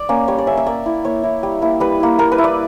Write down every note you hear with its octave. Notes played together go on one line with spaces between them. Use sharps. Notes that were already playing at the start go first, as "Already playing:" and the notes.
Already playing: D5
A#3 C#4
G3 C#5
D5
A#3 C#4 E5
E5
A#3 D5
E4
A#3 C#5
E4
G3
A#3 E4
G3 B4
A#3 E4
A#3 A#4
B4
E4
D5